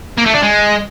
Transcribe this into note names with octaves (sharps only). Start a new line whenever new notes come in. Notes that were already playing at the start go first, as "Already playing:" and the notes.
A#3
A3
D4
G#3